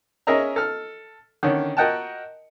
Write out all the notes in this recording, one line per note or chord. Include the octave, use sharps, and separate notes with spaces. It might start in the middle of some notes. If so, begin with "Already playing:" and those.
C#4 G#4 A#4 D#5 E5 A#5
A4 F6
D3 D#3 C#4
F#4 A#4 D#5 F#5 G5 A5